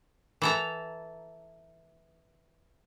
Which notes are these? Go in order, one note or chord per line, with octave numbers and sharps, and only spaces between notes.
E3 A4 A#5